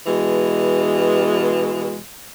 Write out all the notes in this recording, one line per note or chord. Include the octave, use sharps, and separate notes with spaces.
B2 E3 G#3